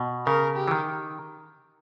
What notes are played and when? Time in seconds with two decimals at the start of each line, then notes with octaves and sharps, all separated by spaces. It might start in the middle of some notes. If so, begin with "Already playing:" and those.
Already playing: B2
0.26 C#3 A#4
0.56 G4
0.68 E3
0.71 D#3